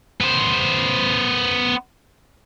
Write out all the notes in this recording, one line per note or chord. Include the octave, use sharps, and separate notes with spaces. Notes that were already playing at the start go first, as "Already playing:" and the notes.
B3 C5